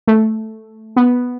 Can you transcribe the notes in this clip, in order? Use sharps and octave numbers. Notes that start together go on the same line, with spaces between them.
A3
B3